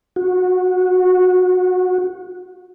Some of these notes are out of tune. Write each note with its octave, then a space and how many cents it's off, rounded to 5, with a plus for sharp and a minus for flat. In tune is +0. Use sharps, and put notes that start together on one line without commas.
F#4 -20